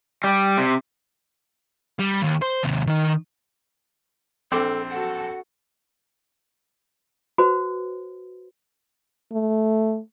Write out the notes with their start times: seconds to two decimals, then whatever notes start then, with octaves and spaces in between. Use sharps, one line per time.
0.24 G3
0.57 C3
1.99 G3
2.22 D#2
2.42 C5
2.63 D#2 C3
2.87 D#3 D#5
4.52 A#1 C4 A4 D6
4.90 F#4 A4 F#5
7.38 F#4 B4 C5
9.33 A3